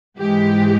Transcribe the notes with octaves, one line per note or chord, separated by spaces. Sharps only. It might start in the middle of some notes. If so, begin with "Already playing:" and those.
G#2 E3 G#3 G4